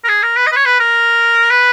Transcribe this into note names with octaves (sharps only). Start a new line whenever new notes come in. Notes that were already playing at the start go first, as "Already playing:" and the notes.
A#4
G#4
A#4
B4
D#5
B4
C#5
B4
A#4
B4